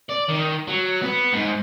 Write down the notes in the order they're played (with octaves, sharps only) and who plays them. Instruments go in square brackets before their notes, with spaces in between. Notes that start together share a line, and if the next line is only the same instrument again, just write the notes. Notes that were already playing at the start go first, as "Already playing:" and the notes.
[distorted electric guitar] D5
D#3
F#3
B3
G#2